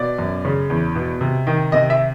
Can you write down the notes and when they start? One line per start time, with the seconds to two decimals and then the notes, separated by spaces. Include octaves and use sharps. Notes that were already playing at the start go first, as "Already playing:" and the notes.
Already playing: B2 D5
0.18 F#2
0.45 C#3
0.70 E2
0.95 B2
1.21 C3
1.47 D#3
1.72 C3 D#5
1.90 E5